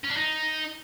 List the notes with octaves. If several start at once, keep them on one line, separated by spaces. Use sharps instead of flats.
C#4
D4
D#4